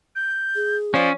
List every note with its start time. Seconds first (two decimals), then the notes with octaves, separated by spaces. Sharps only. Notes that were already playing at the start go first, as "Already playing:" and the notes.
0.15 G6
0.56 G#4
0.94 F3 C#4 D5